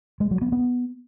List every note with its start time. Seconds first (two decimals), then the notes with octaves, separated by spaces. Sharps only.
0.20 G#3
0.31 F#3
0.42 B3
0.52 B3